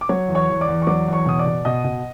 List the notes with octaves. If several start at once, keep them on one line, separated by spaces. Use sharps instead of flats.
D6
F#3 C#5 C#6
E2
C#5 C#6
E2
D5 D6
E2
C#6
F#3 D5 D6
E2
C#5 C#6
B2 D#6
D5 D6
B2
B2 D#5 D#6
B2